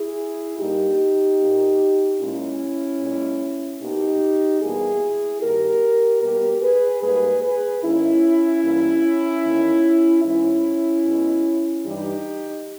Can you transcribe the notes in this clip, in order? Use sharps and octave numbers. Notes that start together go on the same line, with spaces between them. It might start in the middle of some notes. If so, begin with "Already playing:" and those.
Already playing: E4 G#4
G2 G3 A#3 D#4 G4
A#2 A#3
A#2 G#3 C#4 E4
A#2 G#3
B2 A#3 D#4 G4
E2 B2 G3 A#3 E4 G#4
G2 D#3 A#3 G4 A#4
B2 G3 A#3 G4 A#4
G#4 B4
G#2 G3 A#3 G#4 B4
G#4 B4
G#2 D#3 A#3 C#4 E4
G2 E3 A#3
E2 D#3 A#3
G#2 E3 G#3 C#4 E4
B2 G#3
G2 E3 G3 D#4 G4